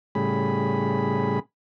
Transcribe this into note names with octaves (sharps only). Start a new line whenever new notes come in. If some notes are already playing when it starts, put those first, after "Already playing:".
A2 C#3 G3 G#4 B5